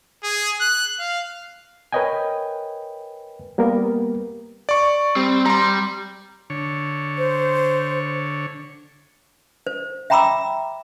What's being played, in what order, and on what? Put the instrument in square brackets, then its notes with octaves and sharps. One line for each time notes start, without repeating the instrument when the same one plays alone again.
[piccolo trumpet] G#4
F#6
F5
[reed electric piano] A#4 B4 C#5 D#5 G5 G#5
G3 A#3 B3 A#4
[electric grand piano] D5 C#6
[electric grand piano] G3 [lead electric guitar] C4
[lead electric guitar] G3 [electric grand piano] A#5 C6
[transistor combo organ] D3 C#5
[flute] C5
[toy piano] C5
E5 G5 A#5 B5 D6 E6